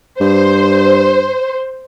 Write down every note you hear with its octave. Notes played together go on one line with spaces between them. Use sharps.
G2 C5